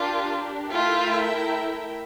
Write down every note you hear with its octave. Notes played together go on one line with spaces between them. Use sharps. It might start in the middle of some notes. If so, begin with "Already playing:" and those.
Already playing: D4 F4 G4 A#4
A3 E4 F4 A#4 E5 G5